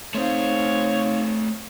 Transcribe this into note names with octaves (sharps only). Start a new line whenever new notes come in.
A3 C4 D#4 C5 C#5 F5